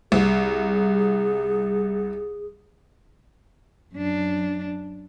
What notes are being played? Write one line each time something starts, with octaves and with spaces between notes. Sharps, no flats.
C2 G#4
F#2 D4